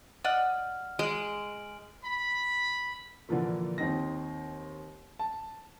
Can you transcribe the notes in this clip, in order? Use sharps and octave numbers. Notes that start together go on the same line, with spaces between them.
D5 D#5 F#5 F6
G#3 G#5 D7 F#7
B5
A#2 D3 E3 F3 A#3
D#2 C4 D#4 A#6
A5